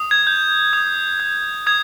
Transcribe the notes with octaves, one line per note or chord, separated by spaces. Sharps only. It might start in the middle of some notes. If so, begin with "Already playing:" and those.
Already playing: D#6
G#6
G6
D#6
G6
D#6 G#6